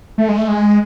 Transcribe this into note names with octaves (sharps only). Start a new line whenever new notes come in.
A3
G#3
A3
G#3